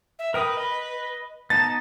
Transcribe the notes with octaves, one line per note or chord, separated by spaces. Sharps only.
E5
A#4 B4 G5 D#6
D#5 B5
B3 D#4 A5 A6